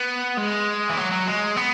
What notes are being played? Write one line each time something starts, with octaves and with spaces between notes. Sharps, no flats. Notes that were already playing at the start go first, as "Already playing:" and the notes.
Already playing: B3
G#3
E3
F#3
F#3
G#3
B3